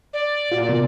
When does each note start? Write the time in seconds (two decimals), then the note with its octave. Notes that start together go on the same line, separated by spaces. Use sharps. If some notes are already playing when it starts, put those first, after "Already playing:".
0.13 D5
0.52 A#2 F4 F#4
0.69 C3 B3